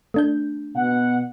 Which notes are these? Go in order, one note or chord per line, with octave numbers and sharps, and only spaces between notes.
A3 D4 G6
B2 F#5